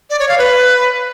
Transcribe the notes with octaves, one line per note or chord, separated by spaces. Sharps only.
D5
C#5
F5
B4